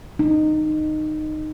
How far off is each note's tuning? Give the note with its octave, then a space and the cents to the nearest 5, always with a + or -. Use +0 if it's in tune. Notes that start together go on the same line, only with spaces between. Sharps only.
D#4 -15